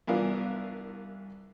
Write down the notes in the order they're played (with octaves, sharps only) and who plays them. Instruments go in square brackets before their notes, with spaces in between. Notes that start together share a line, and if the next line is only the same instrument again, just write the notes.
[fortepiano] C2 E3 B3 D4 A#4 F5